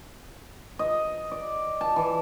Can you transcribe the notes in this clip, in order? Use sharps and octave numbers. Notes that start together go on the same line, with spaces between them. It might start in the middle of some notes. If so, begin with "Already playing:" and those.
D#5
D5
A5
E3